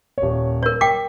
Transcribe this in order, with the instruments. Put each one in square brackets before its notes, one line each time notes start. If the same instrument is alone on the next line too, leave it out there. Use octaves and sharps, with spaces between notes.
[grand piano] D#1 C#5
[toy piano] A#4 C#5
[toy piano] G5 D6 [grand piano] B6